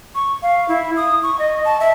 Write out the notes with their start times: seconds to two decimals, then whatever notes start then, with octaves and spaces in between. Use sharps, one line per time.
0.15 C#6
0.43 F5
0.69 E4
0.97 D#6
1.23 C#6
1.39 D#5
1.65 A5
1.80 E5